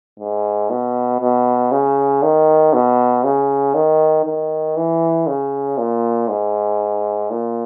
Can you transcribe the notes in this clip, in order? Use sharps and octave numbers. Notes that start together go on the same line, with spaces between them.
G#2
B2
B2
C#3
D#3
B2
C#3
D#3
D#3
E3
C#3
A#2
G#2
A#2